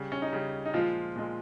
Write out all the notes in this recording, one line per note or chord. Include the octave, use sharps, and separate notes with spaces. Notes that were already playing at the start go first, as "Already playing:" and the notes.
Already playing: C#3 G3
C#4
D#4
C#3 G3
D#4
A#2 F3 G#3 F4
A#2 F3 G#3